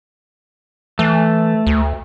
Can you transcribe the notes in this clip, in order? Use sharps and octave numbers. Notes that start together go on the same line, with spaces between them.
E3 A3
D2